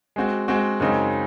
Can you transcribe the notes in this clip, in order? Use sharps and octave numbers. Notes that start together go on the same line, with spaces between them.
G#3 C4 F#4
G#3 C4 F#4
F#2 C#3 G#3 C4 D#4